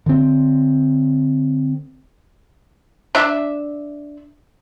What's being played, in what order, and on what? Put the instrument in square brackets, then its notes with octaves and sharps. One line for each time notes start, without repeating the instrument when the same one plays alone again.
[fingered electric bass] D3 C4
[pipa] D4 E5